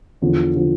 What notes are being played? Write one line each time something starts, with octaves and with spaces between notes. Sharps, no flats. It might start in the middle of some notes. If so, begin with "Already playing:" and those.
E2 D3 F3
D3 F3